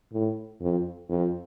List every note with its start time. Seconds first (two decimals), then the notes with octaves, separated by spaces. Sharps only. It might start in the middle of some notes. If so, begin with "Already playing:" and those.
0.13 A2
0.61 F2
1.09 F2